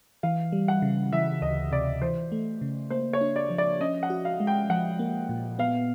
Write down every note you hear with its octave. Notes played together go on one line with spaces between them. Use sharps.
E3 F5
G3
F#5
C#3
E3 E5
D2 D#5
C3 D5
E3 C5
A3
C#3
A#3 C5
C#5
D4
D5
F3
D5
C#4 D#5
F#5
F#4
F5
G#3
G5
F3 F#5
A#3
A#2
B3 F5